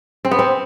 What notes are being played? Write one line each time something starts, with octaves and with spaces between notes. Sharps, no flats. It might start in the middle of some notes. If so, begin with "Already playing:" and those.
C4
B3
C4